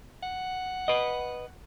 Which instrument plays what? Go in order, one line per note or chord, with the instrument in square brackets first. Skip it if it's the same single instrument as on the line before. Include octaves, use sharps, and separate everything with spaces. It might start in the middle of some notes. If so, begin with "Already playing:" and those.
[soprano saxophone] F#5
[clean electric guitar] B4 D#5